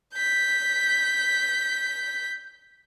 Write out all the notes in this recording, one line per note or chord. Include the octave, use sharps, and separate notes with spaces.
G6 B6